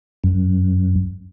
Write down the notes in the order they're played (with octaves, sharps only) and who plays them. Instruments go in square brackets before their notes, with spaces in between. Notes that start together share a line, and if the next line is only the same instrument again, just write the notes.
[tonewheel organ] F#2